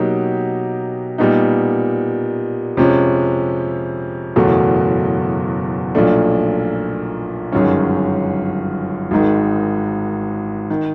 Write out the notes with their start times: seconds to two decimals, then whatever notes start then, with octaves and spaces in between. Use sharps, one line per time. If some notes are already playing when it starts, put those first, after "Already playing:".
Already playing: B2 F#3 A#3 D#4 G4
1.18 A#2 G3 B3 D#4
2.77 F2 C3 F3 G#3 C#4
4.36 F#1 E2 B2 F#3 A3
5.95 B1 A#2 F3 A3 D4
7.52 G1 F#2 D#3 G#3 C#4
9.11 G#1 G#2 D#3 G#3
10.70 D#3